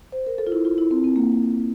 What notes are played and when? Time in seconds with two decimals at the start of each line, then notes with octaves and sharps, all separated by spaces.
0.12 C5
0.27 A#4
0.38 A4
0.47 F4
0.52 E4
0.65 F4
0.78 E4
0.91 C4
1.04 C4
1.16 A#3